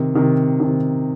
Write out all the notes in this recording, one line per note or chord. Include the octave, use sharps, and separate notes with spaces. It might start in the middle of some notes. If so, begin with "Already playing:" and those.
Already playing: C3 D#3
C3 D#3
C3 D#3